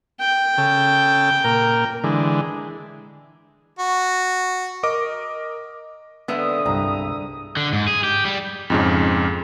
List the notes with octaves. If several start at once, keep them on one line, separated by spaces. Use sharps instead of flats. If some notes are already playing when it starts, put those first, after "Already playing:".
G5
C#3 A4
A#2 A#4
D3 E3 G#3
F#4
A#4 D#5 D6
D3 G#3 B3 C4 E5 F5 D#6
C2 G2 A#5
D3
G#2
G#4
G4
G3
F2 G#2 C#3